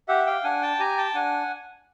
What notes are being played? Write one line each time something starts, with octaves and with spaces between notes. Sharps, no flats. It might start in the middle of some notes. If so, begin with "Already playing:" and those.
G4 E5 F#5
F5 G5
D4 F#5 G#5
G5 A5
G4 G#5 A#5
G5 A5
D4 F#5 G#5